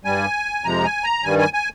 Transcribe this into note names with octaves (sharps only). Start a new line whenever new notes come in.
G2 G3 G#5
F2 C3 F3 G#3 A#5
G#5
A#5
G2 D#3 G3 G#5
G#5
G#5